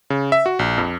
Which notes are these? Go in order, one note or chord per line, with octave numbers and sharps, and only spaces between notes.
C#3
E5
F#4
A#1
F2